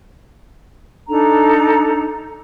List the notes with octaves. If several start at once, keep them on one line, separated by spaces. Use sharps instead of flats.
D4 D#4 A4 A#5